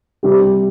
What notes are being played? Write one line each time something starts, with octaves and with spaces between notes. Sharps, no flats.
C3 G3 G4